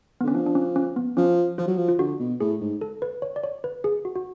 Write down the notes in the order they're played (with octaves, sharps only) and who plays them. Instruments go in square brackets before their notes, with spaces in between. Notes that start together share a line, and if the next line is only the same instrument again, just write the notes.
[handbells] B3
[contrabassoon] D3 [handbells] C#4
[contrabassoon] F3 [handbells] D4
[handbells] D4
C#4
C#4
B3
[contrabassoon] F3 [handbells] C#4
[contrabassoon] F3 [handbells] F4
[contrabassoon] F#3
F3
[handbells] F4
[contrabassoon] D3 [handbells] F#4
[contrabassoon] B2
[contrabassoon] A2 [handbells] G#4
[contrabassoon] G#2
[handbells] A4
B4
C#5
D5
C#5
B4
G#4
F#4
F#4